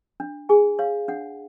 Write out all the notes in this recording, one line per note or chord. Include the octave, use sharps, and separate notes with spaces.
D4
G#4 G#5
C#5 F5
D4 F#5